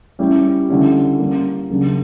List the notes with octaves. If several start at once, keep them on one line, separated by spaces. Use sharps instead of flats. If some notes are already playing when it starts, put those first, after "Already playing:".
G3 C#4 E4 G4
D3 G3 C#4 E4
G3 A#3 C#4
C#3 F#3 A#3 D4